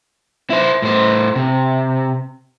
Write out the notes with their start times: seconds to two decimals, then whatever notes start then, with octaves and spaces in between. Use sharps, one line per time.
0.50 E4 C5
0.82 A2 C5
1.36 C3